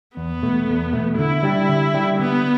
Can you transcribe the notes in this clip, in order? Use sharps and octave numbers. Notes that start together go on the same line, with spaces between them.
E2 B3
B2 A3
E2
B2 A3
D3 E4
G3 D4 G4
D3
G3 D4 G4
D3 B3